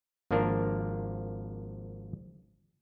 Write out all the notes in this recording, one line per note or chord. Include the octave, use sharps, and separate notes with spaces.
G#1 F3 A#3 D4 A#4